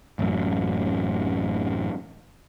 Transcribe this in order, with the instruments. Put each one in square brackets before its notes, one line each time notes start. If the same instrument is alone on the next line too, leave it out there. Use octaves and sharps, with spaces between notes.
[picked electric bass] A1 F#2